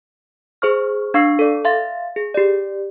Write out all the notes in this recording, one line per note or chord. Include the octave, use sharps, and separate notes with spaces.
G#4 C5 C#6 F6
D4 F5 C#6 E6 C7
A4 D5
E5 F5 C6 A6
G#4
G4 D5